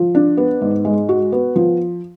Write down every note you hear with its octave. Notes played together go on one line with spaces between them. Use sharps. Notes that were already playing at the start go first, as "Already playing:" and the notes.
Already playing: F3
D4
B3
G#2
G#3
F#4
B3
F3